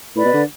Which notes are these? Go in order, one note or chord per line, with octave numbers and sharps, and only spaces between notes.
A2 B4 D5 B5
B2
D3